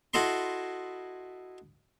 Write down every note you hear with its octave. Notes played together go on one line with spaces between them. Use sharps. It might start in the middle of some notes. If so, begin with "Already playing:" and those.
E4 F#4 A4 D#5 B5 C6